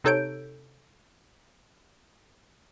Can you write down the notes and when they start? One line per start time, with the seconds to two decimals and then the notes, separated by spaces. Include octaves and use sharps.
0.04 C3 D#4 A4 C#5 G6 D7